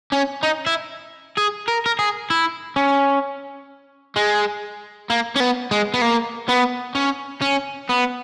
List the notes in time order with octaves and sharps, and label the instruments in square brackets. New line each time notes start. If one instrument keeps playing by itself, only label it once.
[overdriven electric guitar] C#4
D#4
E4
G#4
A#4
A#4
G#4
E4
C#4
G#3
A#3
C#4
B3
G#3
B3
A#3
B3
C#4
C#4
B3